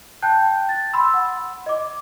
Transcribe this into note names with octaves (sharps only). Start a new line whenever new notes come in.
G5 A5 F#6 G6
A6
B5 C6 E6
F#5
D#5 D6